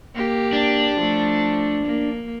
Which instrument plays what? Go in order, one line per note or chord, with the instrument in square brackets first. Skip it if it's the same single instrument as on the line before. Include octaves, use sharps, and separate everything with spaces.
[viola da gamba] A#3 G4
[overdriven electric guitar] D4
[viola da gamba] F3 A3
A#3